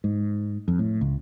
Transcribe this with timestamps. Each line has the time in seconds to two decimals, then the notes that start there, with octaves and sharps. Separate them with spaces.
0.04 G#2
0.68 F2
0.79 A2
1.01 C#2